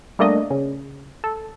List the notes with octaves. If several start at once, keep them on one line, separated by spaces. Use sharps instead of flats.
G3 A3 A#3 D4 D#5
C#3
A4